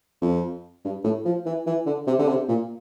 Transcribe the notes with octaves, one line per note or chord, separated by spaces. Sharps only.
F2
G2
A2
F3
E3
E3
D3
C3
D3
C3
A#2